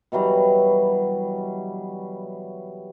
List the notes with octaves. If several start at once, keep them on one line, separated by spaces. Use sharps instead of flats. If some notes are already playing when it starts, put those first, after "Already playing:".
B2 E3 F#3 G3